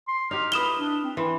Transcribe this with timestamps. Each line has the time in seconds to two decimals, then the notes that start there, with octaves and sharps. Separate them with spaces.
0.08 C6
0.31 D#4 G4 F6
0.52 E4 B4 D#6 E7 G7
0.79 D4
1.04 C4
1.17 E3 C6